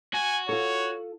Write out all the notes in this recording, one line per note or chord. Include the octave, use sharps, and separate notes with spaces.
F#4 G#5
F4 A4 C#5